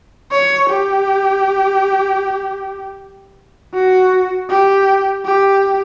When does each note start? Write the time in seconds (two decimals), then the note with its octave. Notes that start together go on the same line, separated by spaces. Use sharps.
0.32 C#5
0.69 G4
3.74 F#4
4.49 G4
5.25 G4